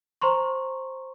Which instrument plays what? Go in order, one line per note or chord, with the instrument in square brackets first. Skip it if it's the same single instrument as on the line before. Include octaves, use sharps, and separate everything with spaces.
[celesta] C5 A#5 C6 C#6